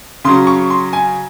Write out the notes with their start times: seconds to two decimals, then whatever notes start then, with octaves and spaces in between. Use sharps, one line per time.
0.25 C#3 F#3 C#4 C6
0.47 C#6
0.70 C6
0.93 G#5